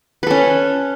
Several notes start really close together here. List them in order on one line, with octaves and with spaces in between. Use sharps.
B4 A4 C#4